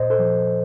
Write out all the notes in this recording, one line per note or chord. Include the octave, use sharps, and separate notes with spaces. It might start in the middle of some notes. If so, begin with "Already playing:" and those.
Already playing: A#2 C5 D#5
A4 C5
F3